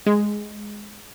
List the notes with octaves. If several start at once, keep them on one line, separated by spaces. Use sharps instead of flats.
G#3